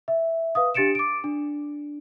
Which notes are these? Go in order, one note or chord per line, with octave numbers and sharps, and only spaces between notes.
E5
B4 F5 D#6
D4 G4 A6 C#7 D7 E7
D6 D7
D4